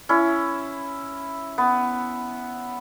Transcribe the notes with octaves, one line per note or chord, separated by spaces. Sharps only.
C#4 E4
B3